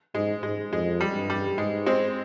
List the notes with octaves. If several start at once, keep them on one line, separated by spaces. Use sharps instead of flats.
G#2 G#3
G#2 G#3
F2 G#3
G3
G2
G3
G#2 G#3
G#3 C4